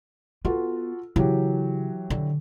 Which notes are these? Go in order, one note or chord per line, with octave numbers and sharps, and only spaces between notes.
B3 F4 F#4 A4
C#3 E3 F#3 G4
D3